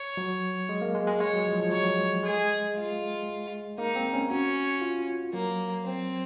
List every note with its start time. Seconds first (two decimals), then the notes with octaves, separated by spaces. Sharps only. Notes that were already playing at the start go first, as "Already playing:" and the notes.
Already playing: C#5
0.17 F#3
0.69 G#3
0.82 A#3
0.95 G#3
1.07 G#3
1.20 G#3 C#5
1.33 F#3
1.46 F3
1.59 F3
1.72 F#3 C#5
2.23 G#3 G#4
2.75 F4
3.78 A#3 D#4
3.96 C4
4.13 C#4
4.30 C#4 F#4
4.82 F4
5.33 F#3 A#3
5.85 C4